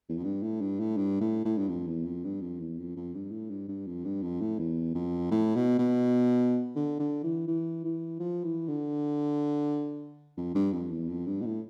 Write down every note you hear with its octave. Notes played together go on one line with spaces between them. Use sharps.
E2
F2
G2
A2
G2
A2
G2
A2
A2
G2
F2
E2
F2
G2
F2
E2
F2
F2
G2
A2
G2
G2
F2
G2
F2
A2
E2
F2
A2
B2
B2
D3
D3
E3
E3
E3
F3
E3
D3
F2
G2
F2
E2
F2
G2
B2
A2